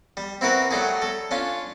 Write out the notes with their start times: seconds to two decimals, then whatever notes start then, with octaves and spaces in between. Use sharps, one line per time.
0.17 G3
0.41 C4 E4 F#4 A#4 B4
0.71 F#3 G3 A3 G4 G#4
1.02 A4
1.31 C#4 D4 F4